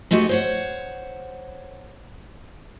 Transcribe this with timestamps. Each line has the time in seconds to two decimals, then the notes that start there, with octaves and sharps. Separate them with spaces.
0.11 G#3 A3 D#4 F#4 G4
0.29 C5 C#5 F#5